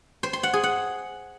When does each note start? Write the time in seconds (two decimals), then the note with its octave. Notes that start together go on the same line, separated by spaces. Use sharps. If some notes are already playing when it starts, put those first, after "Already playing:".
0.23 C5
0.33 C6
0.43 F#5
0.53 G#4
0.64 F#5